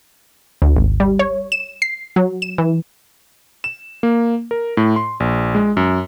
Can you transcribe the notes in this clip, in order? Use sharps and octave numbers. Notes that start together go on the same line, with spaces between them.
D2
G#1
G3
C#5
E7
C7
F#3
E7
E3
E7
A#3
A#4
A2
C6
A#1
G#3
F#2